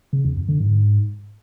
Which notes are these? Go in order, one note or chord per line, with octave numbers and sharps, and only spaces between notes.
C#3
E2
F2
D3
G#2